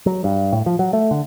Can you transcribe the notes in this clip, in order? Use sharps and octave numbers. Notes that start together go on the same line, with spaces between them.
F#3
G2
A2
F3
F#3
A3
D3